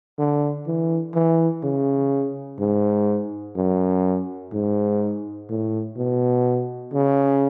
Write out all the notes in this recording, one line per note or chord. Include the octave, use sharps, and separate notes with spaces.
D3
E3
E3
C#3
G#2
F#2
G#2
A2
B2
C#3